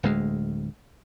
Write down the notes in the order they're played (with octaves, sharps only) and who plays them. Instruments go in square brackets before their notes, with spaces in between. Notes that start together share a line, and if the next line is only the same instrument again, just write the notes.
[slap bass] D1 D2 G#3